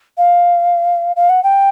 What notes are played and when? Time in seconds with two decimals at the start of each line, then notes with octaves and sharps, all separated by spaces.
0.18 F5
1.16 F5
1.29 F#5
1.43 G5